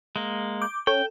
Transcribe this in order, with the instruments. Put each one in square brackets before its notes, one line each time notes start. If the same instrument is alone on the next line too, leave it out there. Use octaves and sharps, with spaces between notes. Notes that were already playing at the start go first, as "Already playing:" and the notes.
[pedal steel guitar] G#3 A#3
[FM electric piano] D6 G6
[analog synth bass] C#4 [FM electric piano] A4 [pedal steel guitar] G5